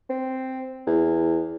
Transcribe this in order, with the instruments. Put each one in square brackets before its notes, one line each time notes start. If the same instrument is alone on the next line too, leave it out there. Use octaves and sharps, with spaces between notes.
[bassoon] C4
E2